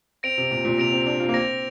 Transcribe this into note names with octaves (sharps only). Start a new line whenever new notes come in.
C4 A#6 D7 F7
C3
A#2
A#2
C3 A#6 D7 F7
C4
D4
F4
A#3
C4 A#6 D7 F7